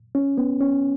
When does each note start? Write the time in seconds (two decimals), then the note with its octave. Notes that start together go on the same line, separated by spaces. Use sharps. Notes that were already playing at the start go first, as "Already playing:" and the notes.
0.15 C#4
0.38 B3
0.61 C#4